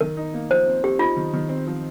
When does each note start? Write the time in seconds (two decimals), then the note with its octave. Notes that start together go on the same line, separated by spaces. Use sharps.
0.01 D#3 A#4
0.17 D#4
0.34 A#3
0.50 F3 C5
0.66 C4
0.84 C4 G4
0.99 D#4 F4
1.16 D#3
1.33 D#3
1.49 C4
1.67 F3